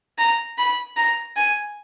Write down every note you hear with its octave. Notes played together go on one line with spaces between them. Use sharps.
A#5
B5
A#5
G#5